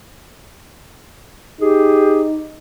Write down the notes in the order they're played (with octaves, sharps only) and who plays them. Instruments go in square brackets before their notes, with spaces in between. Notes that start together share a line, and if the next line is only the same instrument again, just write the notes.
[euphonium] D#4 [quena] G4 [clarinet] G#4